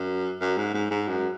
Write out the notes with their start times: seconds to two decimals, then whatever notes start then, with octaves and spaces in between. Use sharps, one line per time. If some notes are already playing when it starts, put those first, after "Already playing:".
Already playing: F#2
0.41 F#2
0.57 G#2
0.74 G#2
0.91 G#2
1.08 F#2